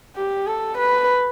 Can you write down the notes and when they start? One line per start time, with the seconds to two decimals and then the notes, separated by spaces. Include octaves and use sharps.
0.16 G4
0.47 A4
0.78 B4